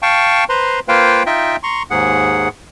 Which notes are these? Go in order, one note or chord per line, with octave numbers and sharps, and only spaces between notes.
F5 G5 A5 C#6
B4 C5 A#5 C6
A#3 F4 B4 C5 F5 G5
D#4 F4 D#5 E5 G5
A#5 C6 C#6
D#2 G#2 G#4 F#5